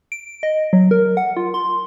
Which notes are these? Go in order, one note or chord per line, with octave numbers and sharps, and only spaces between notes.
D7
D#5
F#3
A#4
F#5
F4
C6